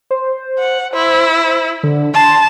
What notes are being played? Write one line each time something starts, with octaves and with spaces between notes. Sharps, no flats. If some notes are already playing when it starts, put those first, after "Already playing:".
C5
F#5
E4 C5
D3
A5 C6